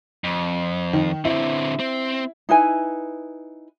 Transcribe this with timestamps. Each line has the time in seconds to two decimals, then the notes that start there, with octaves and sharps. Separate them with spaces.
0.24 F2
0.93 D#3
1.25 D3 C4 E4
1.80 C4
2.49 D#4 E4 B4 G#5